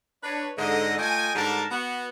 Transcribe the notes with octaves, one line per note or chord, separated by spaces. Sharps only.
D4 B4 C#5
G#2 D3 D#5
A3 F4 D#5 G5 G#5
G#2 D3 G3 D4 A#4 A5
B3 F#4